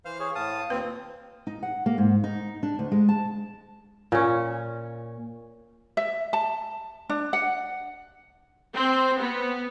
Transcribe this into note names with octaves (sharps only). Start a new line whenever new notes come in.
E3 C5 F5 F6
G#4 C#5
A2 F5 A5 D#6
D#2 A#2 C4 B4
D#4
F#5
A#3
G#2
D#4
D4
D2
G#3
A5
A#2 C#4
E5
A5
D4
F#5
C4
B3